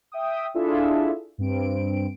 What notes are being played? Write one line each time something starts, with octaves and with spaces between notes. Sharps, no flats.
E5 G5 D#6
D4 E4 F4 G#4 A4 E5
G2 C4 D7